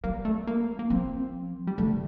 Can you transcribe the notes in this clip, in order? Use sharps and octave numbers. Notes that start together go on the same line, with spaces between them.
G3 A#3
A3
A#3
A#3
F3 C4
G3
D3 A3